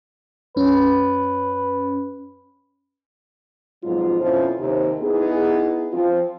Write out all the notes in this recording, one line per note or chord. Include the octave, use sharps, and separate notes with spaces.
F#2 C#4 B4
F2 G#2 B2 F#3 F4
F2 B2 F3 C#4 E4 C5
D#2 C3
B3 D#4 E4 G#4
F3 C4 F4